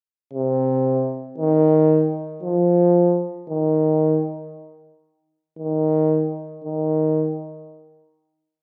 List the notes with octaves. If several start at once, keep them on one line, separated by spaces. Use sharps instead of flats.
C3
D#3
F3
D#3
D#3
D#3